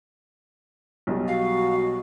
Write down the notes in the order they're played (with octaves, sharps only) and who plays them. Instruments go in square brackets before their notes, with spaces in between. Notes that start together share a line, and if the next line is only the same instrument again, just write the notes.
[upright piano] B1 B2 G3
[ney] F#4 [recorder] F5